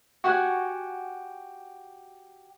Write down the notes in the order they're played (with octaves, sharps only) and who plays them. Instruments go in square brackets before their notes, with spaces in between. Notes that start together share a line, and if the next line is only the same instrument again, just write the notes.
[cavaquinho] F#4 G4 F#5 G#5